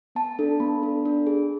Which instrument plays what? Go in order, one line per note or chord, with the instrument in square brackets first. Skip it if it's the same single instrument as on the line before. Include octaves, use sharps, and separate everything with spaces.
[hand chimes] B3 A5
D4 A4
B3 B5
D4 A4
D4
G#4